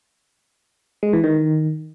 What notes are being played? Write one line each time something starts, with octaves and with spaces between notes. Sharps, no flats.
G#3
E3
D#3